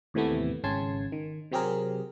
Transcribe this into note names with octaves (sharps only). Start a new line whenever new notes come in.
D#2 A2 C3 E3 A3 B3
G#1 C#3 C#4 A5 C6 G#6
D#3
C3 F#3 C4 G4 G#4 A#4